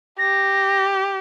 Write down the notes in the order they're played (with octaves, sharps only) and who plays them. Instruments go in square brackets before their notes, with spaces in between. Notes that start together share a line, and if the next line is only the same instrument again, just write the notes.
[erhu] G4 [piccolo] A#6